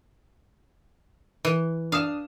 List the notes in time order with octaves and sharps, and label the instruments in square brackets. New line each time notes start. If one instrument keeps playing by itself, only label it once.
[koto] E3
[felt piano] D4 D#6 E7 [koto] F5